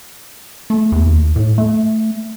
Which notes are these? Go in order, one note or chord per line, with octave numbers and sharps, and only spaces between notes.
A3
E2
D#2
A2
A3